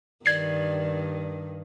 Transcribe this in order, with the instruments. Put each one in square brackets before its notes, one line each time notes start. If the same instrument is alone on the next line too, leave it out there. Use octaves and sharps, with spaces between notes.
[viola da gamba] G2 D#3 [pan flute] D5 [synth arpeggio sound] G#6 C7